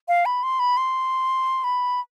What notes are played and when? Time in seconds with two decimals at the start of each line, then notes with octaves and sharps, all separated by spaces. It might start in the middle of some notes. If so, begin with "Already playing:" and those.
0.08 F5
0.26 B5
0.43 C6
0.59 B5
0.77 C6
1.64 B5